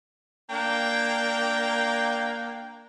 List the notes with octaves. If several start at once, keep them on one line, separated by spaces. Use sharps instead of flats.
A#3 D4 G5